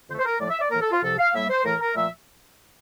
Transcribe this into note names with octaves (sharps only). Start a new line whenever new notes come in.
F2 D3 A3 C5
C5
A#4
A2 F3 A3 D5
E5
D5
A2 E3 A#3 A#4
A4
F4
C2 C3 F3 A4
F5
A2 G3 A#3 E5
C5
A2 E3 A3 A#4
A#4
A#2 F3 A3 E5